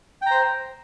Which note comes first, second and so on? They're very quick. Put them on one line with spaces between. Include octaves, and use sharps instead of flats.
G5 A#5 C5